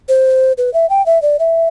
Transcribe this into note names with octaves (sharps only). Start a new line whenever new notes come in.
C5
B4
E5
G5
E5
D5
E5